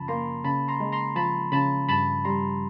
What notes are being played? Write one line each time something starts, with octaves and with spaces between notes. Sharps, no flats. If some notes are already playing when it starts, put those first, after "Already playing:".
Already playing: F#2 C#3 F3 A5 B5
A#3 A#5 C6
C#3 A5 B5
A#5 C6
G#3
A#5 C6
F3 A5 B5
C#3 A5 B5
G2 A5 B5
G3 A#5 C6